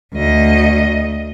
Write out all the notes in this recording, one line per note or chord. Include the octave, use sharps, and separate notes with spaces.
D2 D#5